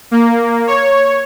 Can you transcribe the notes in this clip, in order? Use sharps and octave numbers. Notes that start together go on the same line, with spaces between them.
A#3
C#5